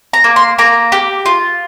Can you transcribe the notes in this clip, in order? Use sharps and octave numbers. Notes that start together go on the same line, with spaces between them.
A#5
A#3
C6
A#3 A#5
G4
F4